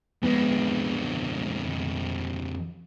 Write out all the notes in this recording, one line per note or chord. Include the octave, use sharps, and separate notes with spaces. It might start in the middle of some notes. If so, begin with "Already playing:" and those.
F2 G#3 B3